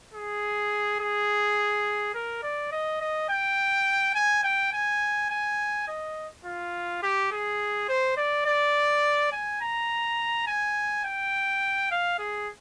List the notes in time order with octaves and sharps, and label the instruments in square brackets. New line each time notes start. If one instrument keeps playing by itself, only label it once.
[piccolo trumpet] G#4
G#4
A#4
D5
D#5
D#5
G5
G#5
G5
G#5
G#5
D#5
F4
G4
G#4
C5
D5
D5
G#5
A#5
G#5
G5
F5
G#4